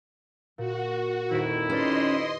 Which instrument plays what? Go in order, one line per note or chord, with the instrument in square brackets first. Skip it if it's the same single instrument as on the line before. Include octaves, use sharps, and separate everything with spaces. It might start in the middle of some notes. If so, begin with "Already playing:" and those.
[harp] A#2 [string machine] F#4
[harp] D#1 D#7 [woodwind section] F2 D#4 E4
[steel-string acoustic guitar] C#4 [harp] G4 B4 D5 [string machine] D#5 C6